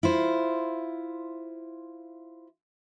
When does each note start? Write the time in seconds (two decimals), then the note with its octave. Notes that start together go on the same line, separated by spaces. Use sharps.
0.03 E4 F4 C5